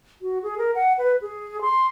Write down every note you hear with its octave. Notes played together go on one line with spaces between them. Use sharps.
F#4
G#4
A#4
F#5
B4
G#4
C6